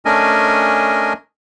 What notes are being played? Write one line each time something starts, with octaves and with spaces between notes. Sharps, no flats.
A3 C#4 D4 A#4 D#5 G#5